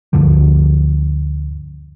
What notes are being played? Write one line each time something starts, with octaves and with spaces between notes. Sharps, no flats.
D2 G2 D3 F3